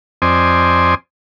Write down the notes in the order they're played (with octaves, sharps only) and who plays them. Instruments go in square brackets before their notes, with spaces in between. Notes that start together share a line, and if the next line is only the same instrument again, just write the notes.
[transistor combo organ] F2 C4 C5 D5 D#5 G#5